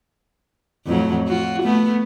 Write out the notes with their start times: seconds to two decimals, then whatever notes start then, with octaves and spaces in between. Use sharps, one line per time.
0.86 F2 A2 F#3
1.28 F4 F#4
1.62 A3 B3